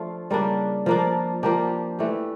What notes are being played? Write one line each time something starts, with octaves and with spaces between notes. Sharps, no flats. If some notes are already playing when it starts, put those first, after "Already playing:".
Already playing: F3 A3 D4 F4
C#3 G3 A#3 D4
F3 A#3 D4
F3 A#3 D4 G4
E3 A3 D4 G4